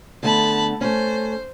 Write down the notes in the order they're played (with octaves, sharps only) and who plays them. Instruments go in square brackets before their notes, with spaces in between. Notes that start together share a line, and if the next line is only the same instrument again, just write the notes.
[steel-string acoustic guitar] D3 A3 B3 [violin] A5 B5
[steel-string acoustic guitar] A3 C#4 [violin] C5